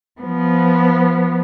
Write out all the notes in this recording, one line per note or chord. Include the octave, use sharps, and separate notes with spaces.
F3 B3